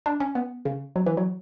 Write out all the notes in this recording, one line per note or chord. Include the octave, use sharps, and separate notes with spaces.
D4
C#4
B3
C#3
F#3
E3
F#3